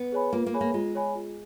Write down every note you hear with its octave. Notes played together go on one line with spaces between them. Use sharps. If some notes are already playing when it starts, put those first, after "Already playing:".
Already playing: B3
G#4 C#5 G#5 B5
A#3 F4
A#3
G#4 C#5 G#5 B5
A#3
G#3 F4
G#4 C#5 G#5 B5
F4